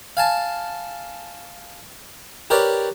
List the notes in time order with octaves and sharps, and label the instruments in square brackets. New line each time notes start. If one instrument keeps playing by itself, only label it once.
[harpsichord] F5 G#5 A5
G4 A#4 B4 C#5 D5